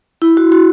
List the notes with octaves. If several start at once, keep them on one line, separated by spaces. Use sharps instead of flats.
E4
F#4
F#4